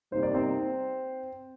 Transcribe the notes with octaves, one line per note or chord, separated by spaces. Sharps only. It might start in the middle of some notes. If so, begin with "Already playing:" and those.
C3 G3 A#3 D#4 C5
D5
C4 C5